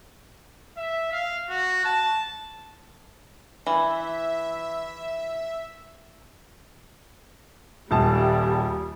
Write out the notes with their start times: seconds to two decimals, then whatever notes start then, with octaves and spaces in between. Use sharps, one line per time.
0.77 E5
1.12 F5
1.49 F#4
1.85 A5
3.67 E3 E5
7.91 D#1 A#1 G3 A5